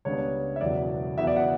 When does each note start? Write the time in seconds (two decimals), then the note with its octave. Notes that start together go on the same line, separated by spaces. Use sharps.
0.05 C#2 C#3 G3 B3 D4 C#5
0.56 E5
0.61 E1 E2 C#3 F#3 D5
1.18 E2 C#3 F#3 B3 E5
1.27 D5
1.36 F#5